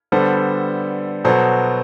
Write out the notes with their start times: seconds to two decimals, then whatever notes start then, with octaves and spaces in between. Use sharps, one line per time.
0.12 D3 G3 B3 A4 C5
1.24 B2 F#3 B3 A4 C5